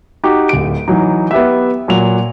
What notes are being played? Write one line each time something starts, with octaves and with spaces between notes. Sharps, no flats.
D#4 F#4 G4
D1 D7
E3 F#3 D#4
B3 G4 E5
A#2 F#3 F7